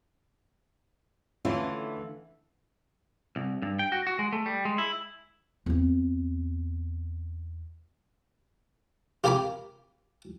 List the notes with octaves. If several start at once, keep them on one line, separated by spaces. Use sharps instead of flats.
D3 E3 A3 C#4 E4 F4
C2
G2
G5
F#4
F#4
G#3
A3
G3
G#3
E4
E2 C4
F4 G4 A#4 G#5 B5 D6